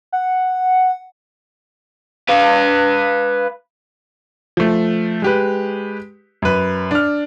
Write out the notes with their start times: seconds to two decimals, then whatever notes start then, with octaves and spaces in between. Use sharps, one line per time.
0.12 F#5
2.29 B4 F5
4.57 F3 A3
5.22 G#3 G4 B4
6.42 F#2 B4
6.91 D4 F6